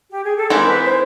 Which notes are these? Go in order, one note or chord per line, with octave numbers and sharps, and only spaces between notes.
G4
G#4
A4
E3 G#3 C4 E4 A#4
B4
C5